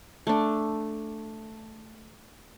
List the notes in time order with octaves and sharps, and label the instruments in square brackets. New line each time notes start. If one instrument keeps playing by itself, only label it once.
[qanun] A3 D4